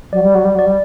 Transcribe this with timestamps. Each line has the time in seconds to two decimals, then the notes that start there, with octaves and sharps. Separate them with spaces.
0.13 F#3 D5
0.23 G3
0.35 F#3
0.45 G3
0.55 F#3 D5
0.66 G3